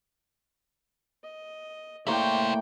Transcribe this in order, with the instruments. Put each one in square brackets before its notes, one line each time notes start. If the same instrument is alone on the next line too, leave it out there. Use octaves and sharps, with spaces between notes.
[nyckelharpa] D#5
[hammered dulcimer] A2 A#3 C#6 [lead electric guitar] E4 C5 [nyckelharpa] D5 G5